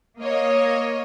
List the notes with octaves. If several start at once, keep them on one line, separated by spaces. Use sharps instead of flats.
A#3 C#5 D#5